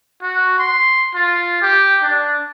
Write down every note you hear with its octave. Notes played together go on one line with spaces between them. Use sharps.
F#4
C6
F4
G4
D4